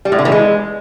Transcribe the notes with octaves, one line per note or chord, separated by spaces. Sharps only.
G3
A2
D3
E3
G#3